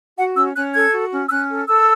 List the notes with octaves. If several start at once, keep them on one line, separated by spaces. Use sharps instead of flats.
F#4 F#5
C#4 E6
C#4 F#6
A4 G#6
F#4
C#4
E6
C#4 F#6
A4
A4 E6